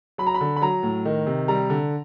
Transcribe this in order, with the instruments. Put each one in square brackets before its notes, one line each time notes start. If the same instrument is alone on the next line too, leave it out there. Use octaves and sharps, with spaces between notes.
[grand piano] F#3 B5
A#5
B5
D3
B5
F#3 A#5
A2
D#3
C3
G3 A#5
D3